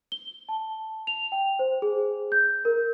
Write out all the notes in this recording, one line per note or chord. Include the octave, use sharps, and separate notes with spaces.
G7
A5
F7
G5
C5
G#4
G6
A#4